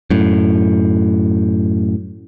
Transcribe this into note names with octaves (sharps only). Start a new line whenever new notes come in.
F#2 A2